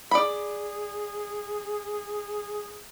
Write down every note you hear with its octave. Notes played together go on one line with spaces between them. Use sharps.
G#4 D5 B5